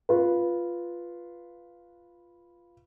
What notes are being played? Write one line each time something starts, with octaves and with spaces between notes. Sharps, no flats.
F4 B4